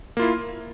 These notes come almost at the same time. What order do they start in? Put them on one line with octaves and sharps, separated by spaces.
A#3 F4 E4